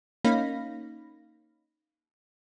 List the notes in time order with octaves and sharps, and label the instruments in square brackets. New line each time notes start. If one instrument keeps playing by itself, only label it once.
[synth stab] A#3 C#4 D#4 F5 B5 A#6